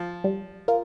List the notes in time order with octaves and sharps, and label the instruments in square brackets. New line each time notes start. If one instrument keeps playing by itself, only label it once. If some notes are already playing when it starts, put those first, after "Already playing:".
Already playing: [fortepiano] F3
[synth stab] G3
F4 A#4